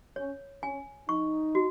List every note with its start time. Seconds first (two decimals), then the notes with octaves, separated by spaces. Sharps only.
0.16 C#4 C#5
0.63 C#4 G#5
1.09 D#4 C#6
1.55 F#4